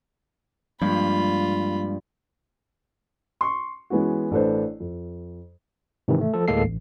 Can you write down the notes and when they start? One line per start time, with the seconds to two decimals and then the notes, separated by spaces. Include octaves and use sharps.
0.82 G2 F3 G#3 A#3 F4 B5
3.41 C6 C#6
3.90 E3 G#3 B3 C#4 F#4
4.31 A1 D4 A4 B4 C5
4.80 F2
6.08 G#2 C3 D#3 E3
6.21 A3
6.34 F3 A4
6.48 D2 A2 G#3 A#3 A4 C7
6.64 A1